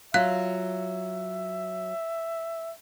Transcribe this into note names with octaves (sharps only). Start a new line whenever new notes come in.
F#3 F4 E5 F5 F#6